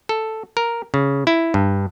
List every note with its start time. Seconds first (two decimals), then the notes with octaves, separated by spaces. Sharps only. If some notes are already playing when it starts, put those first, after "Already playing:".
0.09 A4
0.57 A#4
0.94 C#3
1.27 E4
1.54 G2